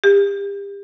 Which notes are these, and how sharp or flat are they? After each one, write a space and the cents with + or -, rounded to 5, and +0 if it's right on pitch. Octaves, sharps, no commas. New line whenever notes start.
G4 +35